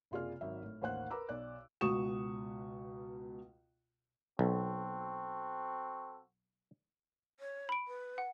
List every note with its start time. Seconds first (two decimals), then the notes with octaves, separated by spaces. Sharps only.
0.11 F#1 C3 F4 G#4 D5 F6
0.41 G#1 F#3 E5
0.63 A2
0.81 A1 D#2 C5 F#5 F#6
1.10 A#4 B4 A#5 B5 D6 E6
1.29 B1 D5 F#6
1.81 C#2 B2 F#4 C#6 D#6 E7
4.39 B1 C4 F#4 A4
7.40 C#5
7.69 B5 D7
7.87 B4
8.18 F#5